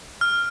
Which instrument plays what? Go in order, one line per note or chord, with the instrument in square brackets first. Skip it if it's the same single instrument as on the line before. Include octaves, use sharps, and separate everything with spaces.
[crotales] F6